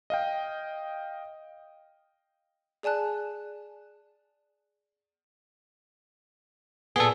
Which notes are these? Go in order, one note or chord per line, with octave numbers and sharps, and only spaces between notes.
D#5 F5 G5
G#4 D5 G#5 A5 F#6
A#2 B3 G#4 A4